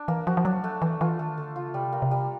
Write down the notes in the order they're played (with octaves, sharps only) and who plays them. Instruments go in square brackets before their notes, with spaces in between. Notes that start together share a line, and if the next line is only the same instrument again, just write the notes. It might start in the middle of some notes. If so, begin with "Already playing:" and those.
Already playing: [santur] D4
[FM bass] E3 [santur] A#3
[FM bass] F3 [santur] F#4
[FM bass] F3
[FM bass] F#3 [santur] D4
[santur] A3
[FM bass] E3 [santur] A3
[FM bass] E3 [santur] F4
[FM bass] D#3 [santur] A3
[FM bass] D3 [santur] A3
[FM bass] C#3 [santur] F4
[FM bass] C3 [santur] G3
[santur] A#3
[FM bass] C3
[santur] G3